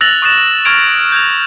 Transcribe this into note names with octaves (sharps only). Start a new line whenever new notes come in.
E6 F#6 A6 A#6 F7 F#7
C#6 D#6 F#6 A6 E7
C#6 F6 G#6 D7 F7
G6 G#6 F7